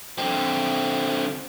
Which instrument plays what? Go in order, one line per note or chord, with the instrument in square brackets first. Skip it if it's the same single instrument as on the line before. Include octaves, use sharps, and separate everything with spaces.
[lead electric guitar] D3 C4